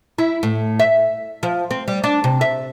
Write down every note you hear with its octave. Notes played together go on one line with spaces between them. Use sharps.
E4
A2
E5
F3
C4
G3
D4
C3
E5